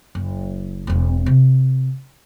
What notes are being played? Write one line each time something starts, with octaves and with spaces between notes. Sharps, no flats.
F#1
E1 C4
C3